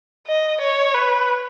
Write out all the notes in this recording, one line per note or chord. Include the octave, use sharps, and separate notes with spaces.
D#5
C#5
B4